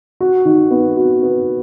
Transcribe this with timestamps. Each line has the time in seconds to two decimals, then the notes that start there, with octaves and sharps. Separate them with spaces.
0.21 F#4
0.45 D#3
0.71 B3
0.97 F#4
1.23 B3